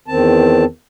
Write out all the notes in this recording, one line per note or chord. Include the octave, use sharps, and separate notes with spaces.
E2 D#3 C4 A5